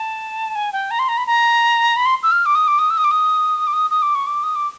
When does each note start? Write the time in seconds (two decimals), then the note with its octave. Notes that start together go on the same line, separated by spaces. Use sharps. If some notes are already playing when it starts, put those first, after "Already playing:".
Already playing: A5
0.55 G#5
0.73 G5
0.91 A#5
0.99 C6
1.09 A#5
1.17 B5
1.26 A#5
1.96 B5
2.06 C6
2.23 E6
2.31 F6
2.46 D6
2.55 D#6
2.68 D6
2.79 D#6
2.90 E6
2.97 D#6
3.04 D6
3.11 D#6
3.67 D6
3.73 D#6
3.90 D#6
4.02 D6
4.15 C#6
4.27 D6
4.43 D#6
4.56 D6